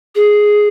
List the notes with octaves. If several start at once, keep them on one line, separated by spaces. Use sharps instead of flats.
G#4